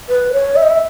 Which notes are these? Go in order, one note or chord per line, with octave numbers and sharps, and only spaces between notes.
B4
C#5
E5
D#5
E5